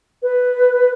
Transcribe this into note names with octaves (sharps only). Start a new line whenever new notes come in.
B4